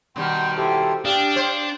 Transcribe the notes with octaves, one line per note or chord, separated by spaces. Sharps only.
B2 D#3 G3 G5 C6
E4 G4 A4 C5
D4 G4 F5 G5 D#6
C5